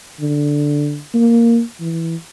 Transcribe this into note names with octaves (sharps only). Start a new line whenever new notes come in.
D3
A#3
E3